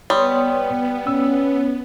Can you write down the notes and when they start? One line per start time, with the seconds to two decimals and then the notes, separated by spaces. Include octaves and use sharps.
0.10 G3 B3 C#5 C6 D#6
1.07 C#4 E6